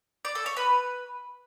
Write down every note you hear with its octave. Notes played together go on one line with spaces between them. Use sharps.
D5
A4
C#5
B4